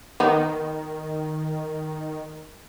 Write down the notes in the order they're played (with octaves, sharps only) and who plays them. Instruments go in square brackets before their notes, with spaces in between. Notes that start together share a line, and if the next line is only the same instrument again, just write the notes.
[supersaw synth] D#3 [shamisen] B3 D#4